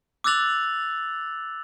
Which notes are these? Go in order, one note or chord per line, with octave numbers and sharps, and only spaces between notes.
D6 E6 F#6 A6 F7 F#7